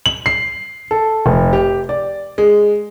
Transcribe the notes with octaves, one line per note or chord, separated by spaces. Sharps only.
F#7
C7
A4
F1
G4
D5
G#3